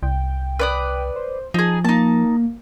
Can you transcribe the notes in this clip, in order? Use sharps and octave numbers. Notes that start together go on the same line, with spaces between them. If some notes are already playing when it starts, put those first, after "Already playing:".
C2 G5
B4 D5 D#6
C5
F3 D#4 G#4 A5
A#3 D#4 A5